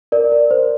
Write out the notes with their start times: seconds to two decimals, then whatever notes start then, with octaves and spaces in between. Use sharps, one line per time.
0.12 A#4 D5
0.32 A#4
0.51 C5